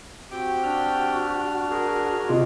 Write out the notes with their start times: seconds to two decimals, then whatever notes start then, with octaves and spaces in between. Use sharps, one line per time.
0.31 C4 F#4 G4 G5 D6
0.63 D4 F6
1.70 G#4 A#4
2.29 C3 F4 D#5